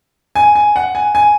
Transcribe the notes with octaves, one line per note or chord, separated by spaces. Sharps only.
G#5
G#5
F#5
G#5
G#5